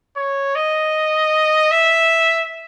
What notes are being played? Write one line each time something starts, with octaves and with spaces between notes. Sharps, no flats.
C#5
D#5
E5